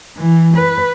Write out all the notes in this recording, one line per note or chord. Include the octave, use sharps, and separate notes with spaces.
E3
B4